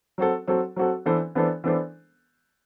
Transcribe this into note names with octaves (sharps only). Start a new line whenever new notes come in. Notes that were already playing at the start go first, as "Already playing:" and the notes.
F#3 C4 F#4 A4
F#3 C4 F#4 A4
F#3 C4 F#4 A4
E3 B3 D4 A4 C5
E3 B3 D4 A4 C5
E3 B3 D4 A4 C5